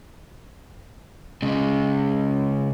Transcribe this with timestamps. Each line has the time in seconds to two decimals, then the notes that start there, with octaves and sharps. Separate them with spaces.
1.42 C#3 G#3